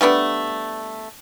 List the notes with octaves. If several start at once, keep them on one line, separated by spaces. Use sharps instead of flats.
G3 A3 B3 D4